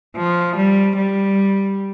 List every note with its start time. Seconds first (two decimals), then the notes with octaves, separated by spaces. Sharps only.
0.17 F3
0.57 G3
0.97 G3